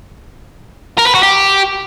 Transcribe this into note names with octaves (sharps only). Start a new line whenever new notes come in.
A#4
B4
F#4
G4